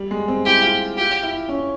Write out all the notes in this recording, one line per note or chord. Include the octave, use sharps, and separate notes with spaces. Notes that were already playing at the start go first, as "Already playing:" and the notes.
Already playing: G3
G#3
C4
E4 G4
F4
F4 G4
E4
C#4